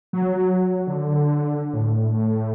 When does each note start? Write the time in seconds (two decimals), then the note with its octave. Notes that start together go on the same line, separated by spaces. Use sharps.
0.13 F#3
0.87 D3
1.73 A2